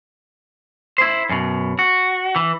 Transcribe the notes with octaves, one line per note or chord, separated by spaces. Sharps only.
E4 C5
F#2 B2
F#4
E3